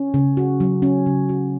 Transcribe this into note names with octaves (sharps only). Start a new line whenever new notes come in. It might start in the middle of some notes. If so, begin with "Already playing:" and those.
Already playing: C#4
C#3
F#4
F#3
C#4
C#3
F#4